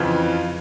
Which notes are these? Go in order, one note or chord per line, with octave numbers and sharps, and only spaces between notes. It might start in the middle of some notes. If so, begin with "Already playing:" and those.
Already playing: F2 C#3 E3 F4